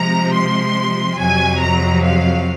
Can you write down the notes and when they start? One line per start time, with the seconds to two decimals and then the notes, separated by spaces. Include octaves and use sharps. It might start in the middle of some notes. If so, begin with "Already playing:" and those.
Already playing: C3 F3 G#3 A#5
0.34 C6
1.19 F2 C3 F#3 G#5
1.61 A#5
2.03 F5